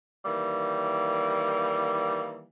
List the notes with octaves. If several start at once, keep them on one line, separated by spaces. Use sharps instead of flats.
D#3 E3 G3 A#3